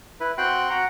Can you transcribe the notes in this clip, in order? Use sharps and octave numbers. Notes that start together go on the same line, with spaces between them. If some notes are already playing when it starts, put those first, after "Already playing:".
E4 B4
C4 F#4 G5 C6 F#6
F#4 F#5 A#5